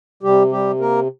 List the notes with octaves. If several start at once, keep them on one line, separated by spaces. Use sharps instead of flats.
C3 G3 G4
G3 G4
A#3 A#4